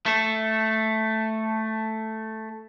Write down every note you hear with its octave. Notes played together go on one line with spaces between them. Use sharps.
A3 A4